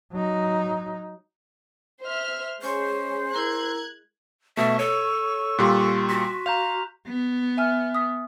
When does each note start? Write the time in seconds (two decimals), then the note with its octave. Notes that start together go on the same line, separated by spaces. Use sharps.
0.12 F#3 D#4
2.02 C5 E5 F6
2.62 G#3 C#4 C5 C#5 G#5 C#6
3.33 E4 A#4 A#5 F#6 G#6
4.57 B2 A3 E5 C#6 E7
4.79 A4 C#5 D#7
5.59 A#2 G3 F4 C6 F#6 B6
6.10 F#4 B6
6.46 F5 A#5 G6 F7
7.08 B3
7.57 E5 G#5 F6
7.95 D#6 B6